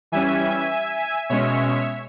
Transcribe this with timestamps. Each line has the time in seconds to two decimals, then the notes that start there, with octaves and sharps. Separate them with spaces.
0.12 E3 G3 C#4 E5 G#5
1.29 B2 G#3 C#4 C#5 E5